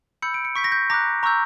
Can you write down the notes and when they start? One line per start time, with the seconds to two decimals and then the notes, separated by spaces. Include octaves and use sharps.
0.22 B5 E6 G6 C#7
0.34 D7
0.45 C#7
0.55 C#6 G6 B6
0.64 A#6
0.72 G6
0.90 A#5 D6 F#6 A#6
1.23 A#5 C#6 E6 G6